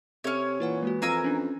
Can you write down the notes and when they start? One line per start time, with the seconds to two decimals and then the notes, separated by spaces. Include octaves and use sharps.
0.24 C3 C#4 A4 C#5 E5
0.60 A#2 E3 E4 B4 F#5
0.83 G#3 A#3 F#4
1.02 F2 A#4 F5 G#5 E6 F6 C7
1.24 C#4 D4